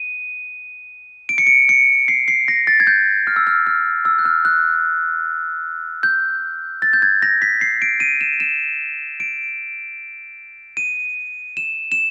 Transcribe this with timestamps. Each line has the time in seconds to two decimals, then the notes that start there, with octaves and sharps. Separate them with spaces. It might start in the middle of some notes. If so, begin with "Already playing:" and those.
Already playing: D#7
1.29 D7
1.38 C#7
1.47 D7
1.69 C#7
2.08 C7
2.28 C7
2.48 A#6
2.67 A6
2.80 G#6
2.87 G6
3.27 F6
3.36 E6
3.47 F6
3.67 F6
4.05 E6
4.19 F#6
4.25 F6
4.45 F#6
6.03 G6
6.82 A6
6.93 G6
7.02 G#6
7.22 A#6
7.42 B6
7.61 C7
7.82 D7
8.00 D#7
8.21 E7
8.40 E7
9.20 D7
10.77 D#7
11.57 E7
11.92 E7